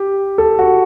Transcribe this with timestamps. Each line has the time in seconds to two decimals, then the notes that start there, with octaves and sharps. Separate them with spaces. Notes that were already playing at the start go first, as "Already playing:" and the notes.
Already playing: G4
0.38 A4
0.59 F#4